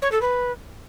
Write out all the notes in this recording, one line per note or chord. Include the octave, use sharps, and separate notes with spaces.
C#5
A4
B4